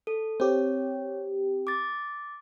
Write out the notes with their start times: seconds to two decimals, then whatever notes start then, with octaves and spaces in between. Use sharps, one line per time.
0.07 A4
0.40 C4 G4 C#5
1.67 D6 A6